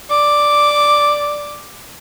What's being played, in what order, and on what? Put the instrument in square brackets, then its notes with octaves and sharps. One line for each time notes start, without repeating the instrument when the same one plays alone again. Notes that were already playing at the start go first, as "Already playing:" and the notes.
[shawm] D5 [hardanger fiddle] D6